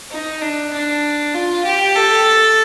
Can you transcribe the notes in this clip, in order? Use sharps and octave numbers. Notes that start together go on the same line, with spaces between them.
D#4
D4
D4
F4
G4
A4